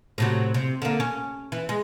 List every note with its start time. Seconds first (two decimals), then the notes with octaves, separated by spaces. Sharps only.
0.18 A2 C3 F#3
0.54 C3
0.82 D3 A#3
1.00 C#4
1.52 E3
1.69 G#3